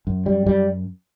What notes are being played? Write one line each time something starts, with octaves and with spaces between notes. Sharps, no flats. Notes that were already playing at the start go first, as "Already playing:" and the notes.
F#2
G3
F#2 G3